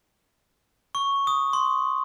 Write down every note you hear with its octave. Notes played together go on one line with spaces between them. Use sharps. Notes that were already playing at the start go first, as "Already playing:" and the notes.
C#6
D#6
C6